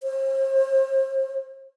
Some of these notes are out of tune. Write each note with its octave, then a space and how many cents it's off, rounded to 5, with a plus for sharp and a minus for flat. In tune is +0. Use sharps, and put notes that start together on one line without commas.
C5 +40